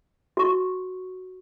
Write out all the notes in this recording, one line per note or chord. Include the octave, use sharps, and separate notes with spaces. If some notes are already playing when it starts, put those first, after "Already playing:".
F#4 C#6